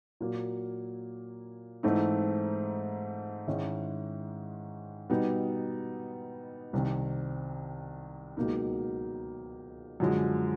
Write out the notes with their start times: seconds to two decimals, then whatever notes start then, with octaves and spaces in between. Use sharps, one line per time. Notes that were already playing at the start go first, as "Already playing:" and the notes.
0.20 A#2 F#3 A#3
1.83 G#2 E3 A3 C4 D#4
3.47 G#2 D#3 G#3 C#4 E4
5.10 B2 G3 B3 D#4
6.73 C2 C3 D#3
8.37 C#2 B2 F#3 A#3 D#4
10.00 F#2 D3 F3 G#3